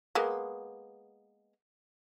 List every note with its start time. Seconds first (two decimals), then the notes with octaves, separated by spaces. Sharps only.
0.15 G#3 A#3 B3